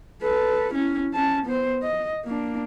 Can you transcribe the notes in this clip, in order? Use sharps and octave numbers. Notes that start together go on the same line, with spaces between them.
A4 B4
C#4 E4
C#4 A5
B3 C5
D#5
A#3 D4